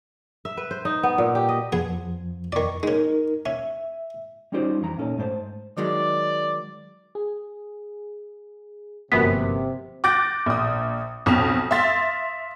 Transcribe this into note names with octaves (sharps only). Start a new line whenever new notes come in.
E5
B4
C5
D#4
B3
A#2
G4
D#5
F2 F3 B3 G#4
F2 D#3 D5 C#6
G#3 C#4 D#4 A#4
C#4 E5
G3 C#4 D#4 F4 G4 C5
F2 E3 A#5
A#2 C#4 D#4 A4
G#2 A3 C5 A5
D#3 F#3 G#3 D5
G#4
G1 F#2 C3 F3 A#3 B3 B6
D6 F#6 G6 A6 A#6 D7
A#1 D#6
B1 F2 C#4 D#6 F7
E5 F5 C6 A6